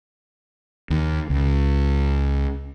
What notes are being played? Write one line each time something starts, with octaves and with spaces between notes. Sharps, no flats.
D#2
C#2